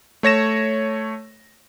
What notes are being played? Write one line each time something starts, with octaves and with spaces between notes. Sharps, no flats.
A3 C#5 A#6 E7